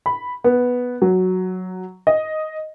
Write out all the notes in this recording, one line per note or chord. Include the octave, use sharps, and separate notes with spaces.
B5
B3
F#3
D#5